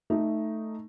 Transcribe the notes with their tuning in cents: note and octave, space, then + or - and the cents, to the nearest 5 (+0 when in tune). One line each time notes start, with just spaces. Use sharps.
A3 +0 D#4 +0